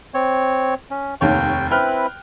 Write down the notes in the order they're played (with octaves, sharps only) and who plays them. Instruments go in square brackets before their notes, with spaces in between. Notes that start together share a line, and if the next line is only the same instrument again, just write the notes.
[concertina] C4 C#5
C#4
[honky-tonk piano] F1 D#2 C#5 [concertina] G5
[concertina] C4 E4 B4 [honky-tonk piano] G5 F6 F#6